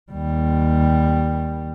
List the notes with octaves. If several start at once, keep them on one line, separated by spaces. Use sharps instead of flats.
D#2 G3